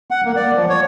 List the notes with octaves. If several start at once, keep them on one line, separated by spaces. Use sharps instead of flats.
F#5
A#3
D5
F3
C#5